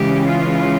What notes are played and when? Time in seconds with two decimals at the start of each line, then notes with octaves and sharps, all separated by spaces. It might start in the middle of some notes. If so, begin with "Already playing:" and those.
Already playing: C#3 E3 G#3 C#4 G4
0.27 F4